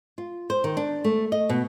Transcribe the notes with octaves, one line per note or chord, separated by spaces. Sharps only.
F4
C5
D#3
D4
A3
D#5
B2